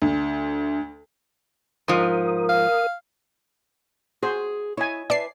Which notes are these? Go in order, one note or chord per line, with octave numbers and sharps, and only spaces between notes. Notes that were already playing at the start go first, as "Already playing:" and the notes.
D2
G#2 F3 A#4 D#6
F5
F#4 G#4 C5
E4 C#5 D#5 G#5
B4 D5 E5 A5 C7